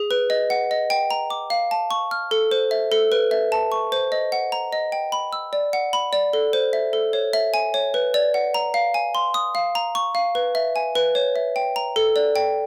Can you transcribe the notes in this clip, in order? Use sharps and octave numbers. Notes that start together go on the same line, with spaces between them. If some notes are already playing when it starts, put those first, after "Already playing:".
Already playing: G#4
B4
D#5
F#5
D#5
G5
A#5
D6
F5
A5
C#6
F6
A4
C5
E5
A4
B4
E5
A5
C#6
C5
D#5
F#5
A#5
D#5
G5
B5
E6
D5
F#5
B5
D5
A4
C5
E5
A4
C#5
E5
G#5
C#5
B4
D5
F#5
A#5
F5
G#5
C6
D#6
F5
A#5
C#6
F5
B4
E5
G#5
B4
C#5
E5
G5
A#5
A4
D5
G5